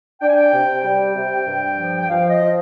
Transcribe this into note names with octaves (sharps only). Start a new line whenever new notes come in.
D4 G5
G#5
G5
C3
G3 G5
C3
G2
F3
G5
F3 F5
D#5
F3